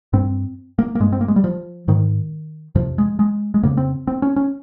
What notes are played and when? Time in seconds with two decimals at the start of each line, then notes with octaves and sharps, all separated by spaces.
0.13 G2 C4
0.79 A#3
0.95 A#3
1.00 G2 G#3
1.12 C4
1.21 A#3
1.28 G#3
1.36 G3
1.44 F3
1.88 G#2 D#3
2.75 F2 C3 F3
2.98 G#3
3.19 G#3
3.54 G#3
3.63 F2 C#3 A#3
3.77 C4
4.07 C4
4.22 C#4
4.36 C#4